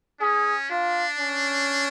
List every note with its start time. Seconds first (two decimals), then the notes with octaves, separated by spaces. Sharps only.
0.20 C#4 G#4
0.70 D4 F4
1.19 C#4